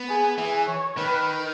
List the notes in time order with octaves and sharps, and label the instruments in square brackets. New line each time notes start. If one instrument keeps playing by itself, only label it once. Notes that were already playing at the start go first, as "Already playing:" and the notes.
Already playing: [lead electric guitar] B3
[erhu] G#4
[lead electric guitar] E3 [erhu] G#4
[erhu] C#5
[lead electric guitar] D#3 [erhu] B4